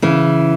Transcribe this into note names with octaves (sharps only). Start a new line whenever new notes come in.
C#3 E3